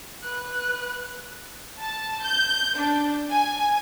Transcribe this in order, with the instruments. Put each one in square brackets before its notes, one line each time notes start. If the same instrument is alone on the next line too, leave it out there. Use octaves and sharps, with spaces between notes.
[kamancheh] B4 F#6
[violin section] A5
G6
D4
G#5